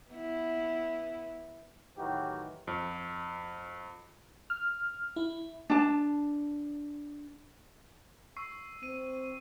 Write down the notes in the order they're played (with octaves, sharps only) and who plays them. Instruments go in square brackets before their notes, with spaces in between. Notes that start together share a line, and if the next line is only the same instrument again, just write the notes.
[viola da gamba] B3 E4
[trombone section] A2 D#3 E3 F#3 F#4 G4
[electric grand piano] F2
[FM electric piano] F6
E4
[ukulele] D4 A5
[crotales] C#6 E6 C7
[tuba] C4 [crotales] D#7